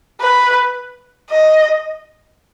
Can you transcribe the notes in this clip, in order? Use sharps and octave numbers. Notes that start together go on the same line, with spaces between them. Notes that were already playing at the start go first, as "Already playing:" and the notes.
B4
D#5